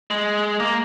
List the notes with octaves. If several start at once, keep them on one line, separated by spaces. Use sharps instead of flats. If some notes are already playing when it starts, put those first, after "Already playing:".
G#3
A#3